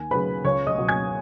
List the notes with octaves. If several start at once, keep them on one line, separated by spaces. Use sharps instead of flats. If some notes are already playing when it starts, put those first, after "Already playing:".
Already playing: D#2 G#5
C#3 F#3 B4 B5
C#2 C#5 C#6
D#5 D#6
B2 F#3
G#5 G#6